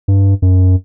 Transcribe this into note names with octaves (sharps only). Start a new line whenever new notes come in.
G2
F#2